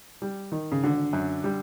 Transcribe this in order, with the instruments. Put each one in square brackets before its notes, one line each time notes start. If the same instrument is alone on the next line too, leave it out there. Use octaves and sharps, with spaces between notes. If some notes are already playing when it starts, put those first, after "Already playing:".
[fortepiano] G3
D#3
[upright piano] C#3
[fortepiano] G#1 [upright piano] D3
[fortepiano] F#2
G3